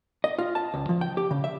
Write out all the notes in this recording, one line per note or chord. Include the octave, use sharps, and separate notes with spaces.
D#5
F4
A5
C#2
F3
G5
G4
C#3
E5